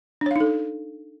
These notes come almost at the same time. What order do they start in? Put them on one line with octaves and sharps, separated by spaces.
D4 C#5 F5 D#4 A4